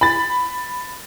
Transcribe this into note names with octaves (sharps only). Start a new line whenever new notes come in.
B5 A6